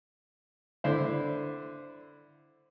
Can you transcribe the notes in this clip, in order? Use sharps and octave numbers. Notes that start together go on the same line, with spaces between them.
D3 E4 C5